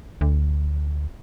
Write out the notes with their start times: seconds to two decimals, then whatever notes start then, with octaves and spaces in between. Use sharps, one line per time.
0.21 D2